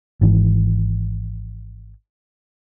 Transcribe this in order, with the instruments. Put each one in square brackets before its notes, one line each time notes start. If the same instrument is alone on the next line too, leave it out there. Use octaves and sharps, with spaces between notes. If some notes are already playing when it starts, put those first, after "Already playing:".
[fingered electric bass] G#1 G#2 E3